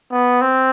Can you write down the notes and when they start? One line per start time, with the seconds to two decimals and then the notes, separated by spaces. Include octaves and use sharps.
0.12 B3
0.42 C4